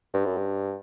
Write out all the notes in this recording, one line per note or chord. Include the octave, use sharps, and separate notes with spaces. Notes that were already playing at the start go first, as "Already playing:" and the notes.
G2
F#2
G2